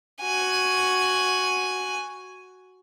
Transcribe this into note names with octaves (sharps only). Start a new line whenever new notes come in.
F#4 G#5